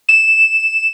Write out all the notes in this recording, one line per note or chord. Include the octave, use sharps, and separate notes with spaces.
E7